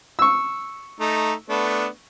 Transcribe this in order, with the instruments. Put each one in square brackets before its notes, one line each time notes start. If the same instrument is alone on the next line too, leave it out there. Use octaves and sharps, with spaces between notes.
[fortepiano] C#6 E6
[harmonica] A3 D#4
A3 B3 D4